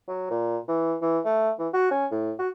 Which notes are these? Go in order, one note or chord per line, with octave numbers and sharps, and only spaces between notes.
F#3
A#2
E3
E3
A3
E3
F#4
C#4
A2
F#4